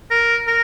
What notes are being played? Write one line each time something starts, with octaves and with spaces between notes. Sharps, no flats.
A#4
A#4